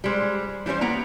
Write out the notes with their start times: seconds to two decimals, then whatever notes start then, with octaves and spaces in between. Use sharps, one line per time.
0.04 G3 G#3 C5
0.66 E3 G3 C#4 D#4 C5
0.81 A#3 B3 A#5